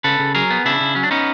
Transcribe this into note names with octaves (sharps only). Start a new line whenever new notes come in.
C#3 A4 B4
C#3
F#3 G#4 A#4
B3
C#3 D4 E4
C#3
F#3 C#4
D4
B3 C#4 D#4